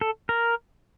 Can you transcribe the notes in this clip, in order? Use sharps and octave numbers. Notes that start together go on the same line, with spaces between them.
A4
A#4